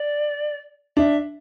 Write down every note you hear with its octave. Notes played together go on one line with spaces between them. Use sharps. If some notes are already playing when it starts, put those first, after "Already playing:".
Already playing: D5
D4 E5